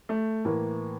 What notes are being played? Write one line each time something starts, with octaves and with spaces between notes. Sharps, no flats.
A3
A2 E3 A#3